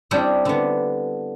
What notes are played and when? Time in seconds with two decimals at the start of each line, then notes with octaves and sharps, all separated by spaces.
0.11 G3 C4 D4 E4 C#5 D#5
0.45 D3 B3